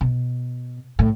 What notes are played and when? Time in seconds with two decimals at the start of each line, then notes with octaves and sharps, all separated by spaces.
0.01 B2
0.99 A2